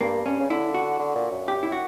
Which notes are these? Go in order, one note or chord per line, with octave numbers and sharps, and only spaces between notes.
G2 A#3
G2 C#4
C#3
D3 E4
F#4
D3
A#2
F#2
G4
E4
F#4